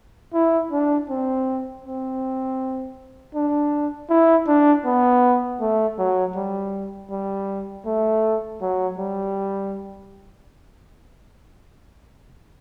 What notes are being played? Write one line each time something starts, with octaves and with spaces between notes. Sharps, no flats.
E4
D4
C4
C4
D4
E4
D4
B3
A3
F#3
G3
G3
A3
F#3
G3